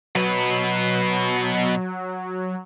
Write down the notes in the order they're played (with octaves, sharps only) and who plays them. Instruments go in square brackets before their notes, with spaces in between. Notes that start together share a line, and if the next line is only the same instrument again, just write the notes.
[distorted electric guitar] B2 B4 [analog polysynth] F#3